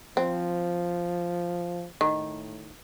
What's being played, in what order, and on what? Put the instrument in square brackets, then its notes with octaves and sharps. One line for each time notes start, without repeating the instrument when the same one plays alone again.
[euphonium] F3 [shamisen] C4
[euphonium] A2 [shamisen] D#3